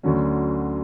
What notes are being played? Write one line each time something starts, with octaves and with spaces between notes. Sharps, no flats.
D2 D3 F#3 C#4